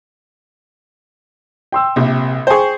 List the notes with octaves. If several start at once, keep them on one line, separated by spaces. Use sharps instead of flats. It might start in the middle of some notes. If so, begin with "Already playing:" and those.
G5 C6 E6
A#1 C3
G#4 C5 G5 C#6